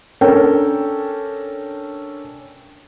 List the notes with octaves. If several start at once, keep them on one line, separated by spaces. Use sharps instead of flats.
C#4 D4 A4 A#4 G5